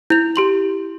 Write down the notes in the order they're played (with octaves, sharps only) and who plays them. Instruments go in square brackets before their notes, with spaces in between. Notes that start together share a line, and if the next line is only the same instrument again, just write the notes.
[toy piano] E4 [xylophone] G6 F7
[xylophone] G4 C6 F#7